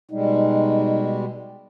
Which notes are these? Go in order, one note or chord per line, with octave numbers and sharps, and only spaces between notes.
B2 G3 G#3 D#4